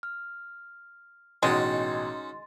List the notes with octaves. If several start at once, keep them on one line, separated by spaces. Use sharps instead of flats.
F6
A1 B2 G#3 C#4 D#4 F#4 C6 A6